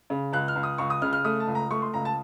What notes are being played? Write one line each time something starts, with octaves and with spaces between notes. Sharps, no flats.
C#3
C#2 F#6
F6
C#2
D#6
C#2 C#6
D#6
C#3 F6
F6
A3 D#6
A5
C#2
A#5
A3 C#6
C6
C#2 A#5
A5